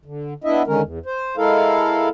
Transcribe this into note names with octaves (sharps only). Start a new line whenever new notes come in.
D3
B3 D4 E4 D#5 E5
D3 D#3 G#3 C#4 A#4
E2
C5
G#3 E4 A4 A#4 F5